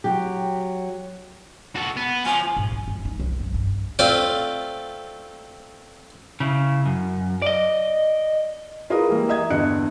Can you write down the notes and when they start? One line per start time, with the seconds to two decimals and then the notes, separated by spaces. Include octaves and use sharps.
0.04 F#3 G4
1.76 F#4 A4
1.97 B3
2.26 F3 G#5
2.57 G#2
2.72 E4
2.88 G2
3.05 D#4
3.20 C2
3.40 F#2
3.54 G2
3.99 A3 C4 F4 D5
6.40 C#3 E4
6.86 F#2
7.42 D5 D#5
8.90 E4 F4 G#4 A#4 B4 D#6
9.09 E3 G3 A#3
9.29 D#5 E5 A#5 D#6 G#6
9.50 E2 G2 D3 D#5 F#6 C#7